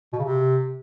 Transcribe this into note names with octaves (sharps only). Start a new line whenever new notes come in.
B2
C#3
C3